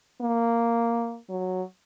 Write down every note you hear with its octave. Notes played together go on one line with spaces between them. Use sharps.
A#3
F#3